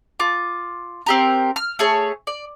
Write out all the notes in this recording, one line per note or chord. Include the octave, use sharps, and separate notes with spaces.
F4 D6
C4 G4 A#4
F6
A3 G#4 C#5
D5